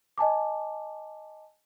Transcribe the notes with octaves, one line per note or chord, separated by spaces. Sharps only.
D#5 G#5 A5 D6